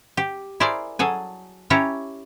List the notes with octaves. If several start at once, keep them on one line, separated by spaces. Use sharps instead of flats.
G4
E4 G#4 A#4 C5 D5
F#3 G#4 A4 G#5
C#4 E4 G4 C#5 A5 A#5